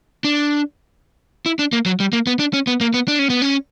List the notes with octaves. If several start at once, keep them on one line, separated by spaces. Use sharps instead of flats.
D4
E4
D4
A#3
F#3
G3
A#3
B3
D4
C#4
B3
A#3
B3
D4
C#4
B3
C#4